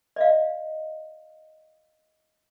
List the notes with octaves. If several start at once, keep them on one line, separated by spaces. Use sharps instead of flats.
D5 D#5 F5